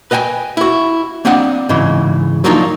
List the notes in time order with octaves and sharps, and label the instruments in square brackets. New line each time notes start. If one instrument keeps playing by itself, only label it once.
[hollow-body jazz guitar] B4 D#5 F5 G5 G#5
E4 F#4
A#3 C4 D4 D#5 F#5
G#2 C#3 E3
F3 F#3 A#3 D4 D#4 F4